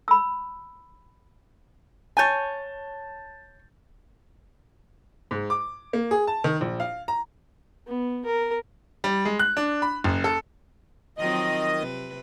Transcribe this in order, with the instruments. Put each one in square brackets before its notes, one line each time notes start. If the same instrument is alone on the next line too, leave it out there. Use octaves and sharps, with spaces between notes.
[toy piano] B5 E6
[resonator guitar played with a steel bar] C#5 G#5 [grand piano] A5 G6 A6
[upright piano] G#2
D6
A#3
G#4
A5
D#3
A#1
F5
A#5
[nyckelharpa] B3
A#4
[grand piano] G3
G#3
F#6
D4
B5
F#1
A4
[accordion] D#3 D#5 [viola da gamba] F3 F#3 C4
[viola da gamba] C3 B4